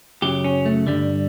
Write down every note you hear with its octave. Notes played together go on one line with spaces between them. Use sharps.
F#2 C#3 F#3 G4
C#4
A3
G2 D3 G3